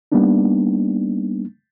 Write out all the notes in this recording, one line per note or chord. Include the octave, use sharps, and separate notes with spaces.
G3 A#3 B3 D4 D#4